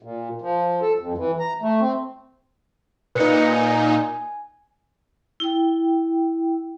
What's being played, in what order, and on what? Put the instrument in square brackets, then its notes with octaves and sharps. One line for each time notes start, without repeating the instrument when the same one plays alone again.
[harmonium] A#2
F3
A4
F2
E3
A#5
A3
C4
[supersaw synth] A#2 D#4 [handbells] B4 C#7
[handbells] G#5
[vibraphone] E4 G5